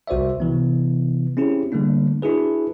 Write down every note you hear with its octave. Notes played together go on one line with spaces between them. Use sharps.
C2 F#4 C5 D5 E5
C3 E3 B3
C4 C#4 E4 G4 G#4
D3 G3 A3 A#3 D4
D4 E4 F#4 G#4 B4